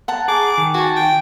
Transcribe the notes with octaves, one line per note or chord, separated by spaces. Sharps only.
F#5 A5 A#5
G#4 D6
D#3
F#4 G#5 A5
G5